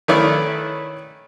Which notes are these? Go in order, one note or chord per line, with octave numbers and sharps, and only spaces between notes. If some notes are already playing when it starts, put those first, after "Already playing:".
D#3 A3 C#4 E4 B4 D5